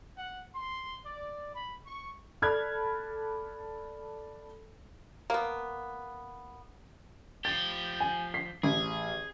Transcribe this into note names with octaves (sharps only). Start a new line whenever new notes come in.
F#5
C6
D5
B5
C#6
A4 D5 B5 F6 F#6 G#6
A#3 B3
F3 G4 A6
G#5
B6 C7
A1 G#4